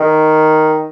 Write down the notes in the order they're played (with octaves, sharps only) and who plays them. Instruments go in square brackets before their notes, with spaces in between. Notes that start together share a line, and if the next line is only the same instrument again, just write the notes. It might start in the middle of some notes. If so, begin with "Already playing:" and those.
Already playing: [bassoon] D#3